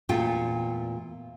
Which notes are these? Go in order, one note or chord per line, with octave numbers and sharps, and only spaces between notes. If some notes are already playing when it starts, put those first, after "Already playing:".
E2 A#2 A3 F4 G5